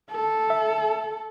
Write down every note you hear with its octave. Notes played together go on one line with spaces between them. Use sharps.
A4
E5